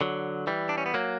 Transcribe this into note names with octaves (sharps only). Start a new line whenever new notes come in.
D3 F#3
E3 G3
D4
C#4
B3
F#3 A#3